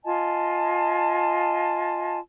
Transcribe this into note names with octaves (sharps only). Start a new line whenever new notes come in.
F4 D#5 G#5 A5